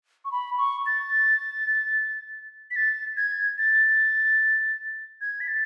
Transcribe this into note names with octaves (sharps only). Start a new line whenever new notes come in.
C#6
B5
C#6
A6
B6
A6
G#6
A6
G#6
B6
A6